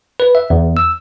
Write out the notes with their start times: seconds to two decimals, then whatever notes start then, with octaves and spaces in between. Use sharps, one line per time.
0.20 B4
0.35 E5
0.50 E2
0.77 E6